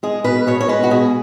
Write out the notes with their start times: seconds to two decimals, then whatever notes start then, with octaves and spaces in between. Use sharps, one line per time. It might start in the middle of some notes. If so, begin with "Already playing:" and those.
0.03 G#3 G#4
0.24 B2 B4
0.47 B2 C#5
0.61 C#5
0.68 G#3 B4
0.83 F#4
0.90 B2 G#4